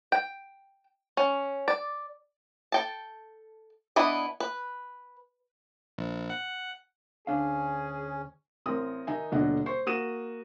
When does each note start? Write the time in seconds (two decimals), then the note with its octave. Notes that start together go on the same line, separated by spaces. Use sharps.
0.12 G5
1.17 C#4
1.68 D5
2.72 A4 G5 A5
3.96 E3 B3 D4 E4 D#5
4.40 B4
5.98 A#1
6.30 F#5
7.27 D2 C#4 D4 G#4 F5
8.66 A1 C4 A#4 D#6
9.07 D#3 D#4 E5 G#5
9.32 D#1 B2 D3 D4 D#5 F#5
9.66 C5 C#6
9.86 A#3 F#4 D#6 D#7 E7